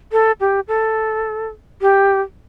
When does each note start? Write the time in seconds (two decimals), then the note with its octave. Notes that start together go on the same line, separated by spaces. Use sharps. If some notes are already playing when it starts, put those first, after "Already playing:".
0.12 A4
0.40 G4
0.68 A4
1.81 G4